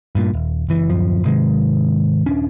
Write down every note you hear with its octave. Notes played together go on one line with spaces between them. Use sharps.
G2 A#2
D#1
F#1 E3
D1 F#2 F3
G#2 C3 D#3 G#3
D#1 C#4 D4